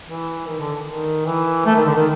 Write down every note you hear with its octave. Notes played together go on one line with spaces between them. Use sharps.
E3
D#3
D3
D#3
E3
A3
D#3
D3
D#3